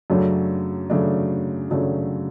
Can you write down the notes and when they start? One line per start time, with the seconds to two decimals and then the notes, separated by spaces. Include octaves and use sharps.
0.10 F#2 C#3 F#3 A3 D4
0.90 F#2 C#3 F#3 A3 D4
1.70 F#2 C#3 F#3 A3 D4